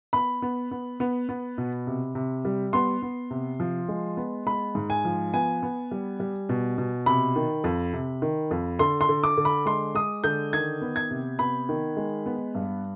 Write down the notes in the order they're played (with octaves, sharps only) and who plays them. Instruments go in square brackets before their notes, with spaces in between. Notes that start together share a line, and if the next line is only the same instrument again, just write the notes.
[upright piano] B3 B5
B3
B3
B3
B3
B2
C3
C3
G3
B3 C6
B3
C3
F3
G#3
B3
G#3 B5
G#2
G#5
F3
B3 G#5
B3
G3
G3
B2
B2
C3 B5
D#3
F2
C3
D#3
F2
D3 C6
C6
D3
D6
D3
B5
G#3 C6
G#3 D#6
D3 G6
D#3 G#6
B3
G#6
C3
B3 B5
D#3
G#3
B3
G2